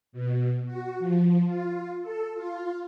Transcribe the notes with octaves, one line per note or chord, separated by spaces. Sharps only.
B2
F#4
F3
F4
A4
F4